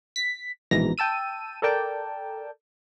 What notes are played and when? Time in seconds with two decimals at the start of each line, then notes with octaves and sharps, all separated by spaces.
0.16 B6
0.71 A#1 G#2 B2 E3 A#5 A#6
0.98 G5 A5 E6 D#7
1.62 A4 A#4 D5 G5 A5